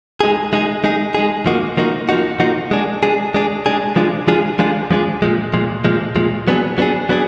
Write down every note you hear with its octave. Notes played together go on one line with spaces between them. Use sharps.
G#3 D#4 G#4
G#3 D#4 G#4
G#3 D#4 G#4
G#3 D#4 G#4
F3 A#3 D#4 F#4
F3 A#3 D#4 F#4
F3 A#3 D#4 F#4
F3 A#3 D#4 F#4
G#3 D4 G#4
G#3 D4 G#4
G#3 D4 G#4
G#3 D4 G#4
F3 G#3 D4 F4 G#4
F3 G#3 D4 F4 G#4
F3 G#3 D4 F4 G#4
F3 G#3 D4 F4 G#4
A#2 F3 G#3
A#2 F3 G#3
A#2 F3 G#3
A#2 F3 G#3
F#3 B3 D4 G#4
F#3 B3 D4 G#4
F#3 B3 D4 G#4